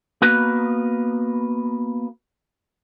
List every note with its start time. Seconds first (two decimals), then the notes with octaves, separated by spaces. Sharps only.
0.22 A#3 B3 F#4 A#4 B4